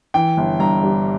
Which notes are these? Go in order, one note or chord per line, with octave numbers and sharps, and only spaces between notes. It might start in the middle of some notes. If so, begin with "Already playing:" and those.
E3 G5
G1
G2 A#5
G3